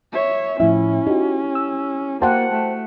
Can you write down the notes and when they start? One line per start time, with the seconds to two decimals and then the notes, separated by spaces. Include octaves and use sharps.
0.13 C#5 E5
0.60 A2 F3 C#4 E4 E5
1.07 D#4 F#4 G4
1.55 E6
2.22 A#3 F#4 C5 F#5 G5 A5
2.52 A3